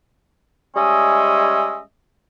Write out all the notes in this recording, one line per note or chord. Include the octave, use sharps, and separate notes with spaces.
G3 G#3 C#4 D#5 E5